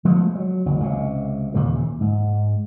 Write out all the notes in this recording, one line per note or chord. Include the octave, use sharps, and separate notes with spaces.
F3 G#3 A3 B3
F#3
F#1 D#2
C#2 C3
D#2 A#2 C#3 E3
G#2